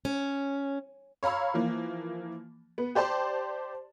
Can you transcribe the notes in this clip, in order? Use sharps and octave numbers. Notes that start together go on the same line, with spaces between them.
C#4
C#5 F5 A#5 B5 E6
E3 F3 A#3
B3
G4 C5 D5 A5 C6